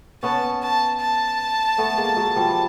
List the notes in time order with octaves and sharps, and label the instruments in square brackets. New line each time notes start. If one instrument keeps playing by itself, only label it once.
[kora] B3 C#4 [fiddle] A5
[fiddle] A5
A5
[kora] A3 B3
G#3 A#3
F#3 G#3
F3 G3